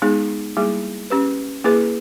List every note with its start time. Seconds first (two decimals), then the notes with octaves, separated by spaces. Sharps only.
0.02 G#3 B3 D#4 G#4
0.57 G3 A#3 E4 G#4
1.10 C#4 G4 B4
1.64 A#3 E4 G#4 B4